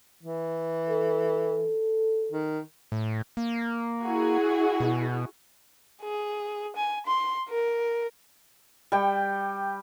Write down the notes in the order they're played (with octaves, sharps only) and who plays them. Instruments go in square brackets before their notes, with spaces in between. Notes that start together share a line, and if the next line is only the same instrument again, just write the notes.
[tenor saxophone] E3
[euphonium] A4
[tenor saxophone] D#3
[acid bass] A2
A#3
[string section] E4 F#4 G#4
[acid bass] B2
[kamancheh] G#4
G#5
C6
A#4
[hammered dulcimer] G3 G5